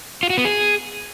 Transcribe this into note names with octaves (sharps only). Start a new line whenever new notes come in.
F4
F#4
B3
G#4